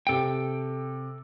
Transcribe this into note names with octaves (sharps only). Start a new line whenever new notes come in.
C3 A4 G5 D7